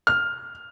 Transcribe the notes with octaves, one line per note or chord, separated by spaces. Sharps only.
F6